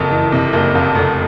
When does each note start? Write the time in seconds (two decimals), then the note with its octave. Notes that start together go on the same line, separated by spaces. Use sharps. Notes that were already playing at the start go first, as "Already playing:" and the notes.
Already playing: F#1 F2 A4
0.11 E3
0.32 C3
0.53 F#1
0.75 F2
0.95 F1